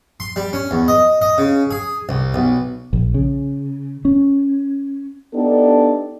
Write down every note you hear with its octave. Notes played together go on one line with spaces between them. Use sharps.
C6
G3
C#4
E2
D#5
D#5
C#3
G#4
C2
B1
A#1
C#3
C#4
B3 D4 D#4 G4 A4